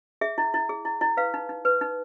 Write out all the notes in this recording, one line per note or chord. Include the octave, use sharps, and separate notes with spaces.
G#4 E5
E4
E4
G#4
E4
E4
B4 F5
D#4
D#4
B4
D#4